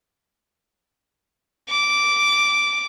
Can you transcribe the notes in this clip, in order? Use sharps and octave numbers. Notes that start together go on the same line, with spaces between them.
D6